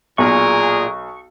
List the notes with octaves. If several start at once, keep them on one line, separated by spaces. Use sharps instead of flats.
B1 A#2 G#4 A#4 C#6